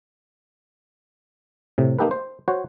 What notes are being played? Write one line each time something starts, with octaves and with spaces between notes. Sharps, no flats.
A2 C3
A#3 D#4 G4 A4 B4
C5
F#4 C5 C#5